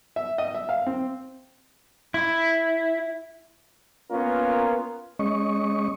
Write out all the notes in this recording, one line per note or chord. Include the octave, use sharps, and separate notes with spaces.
E5
D#5
E5
F5
C4
E4
A#3 B3 C#4 F4 A#4
G#3 C#4 D#5 C#6